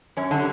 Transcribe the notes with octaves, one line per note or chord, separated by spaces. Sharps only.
F#2 C#4
D3 G3